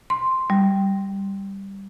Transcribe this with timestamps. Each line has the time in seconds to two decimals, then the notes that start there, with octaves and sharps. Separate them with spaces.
0.10 C6
0.50 G3